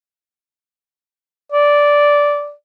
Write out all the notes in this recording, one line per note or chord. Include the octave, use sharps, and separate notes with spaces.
D5